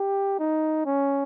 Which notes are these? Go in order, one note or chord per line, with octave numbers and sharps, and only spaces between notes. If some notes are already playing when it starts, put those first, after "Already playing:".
Already playing: G4
D#4
C#4